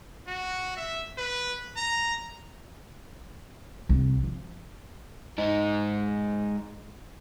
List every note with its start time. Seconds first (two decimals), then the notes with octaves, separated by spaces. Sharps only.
0.27 F#4
0.77 E5
1.17 B4
1.76 A#5
3.89 C2
4.23 F3
5.38 G#2 D#4